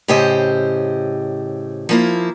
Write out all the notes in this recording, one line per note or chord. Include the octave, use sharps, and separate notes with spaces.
A2 C#3 G4 C5 D#5
F3 A#3 E4